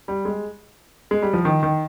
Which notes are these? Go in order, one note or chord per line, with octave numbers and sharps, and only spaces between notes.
G3
G#3
G#3
G3
F3
D#3
D#3